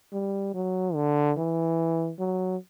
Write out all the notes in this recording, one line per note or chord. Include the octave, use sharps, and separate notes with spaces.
G3
F#3
D3
E3
F#3